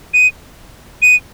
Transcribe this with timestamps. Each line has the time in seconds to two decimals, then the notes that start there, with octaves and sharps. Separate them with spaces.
0.14 D#7
1.02 D#7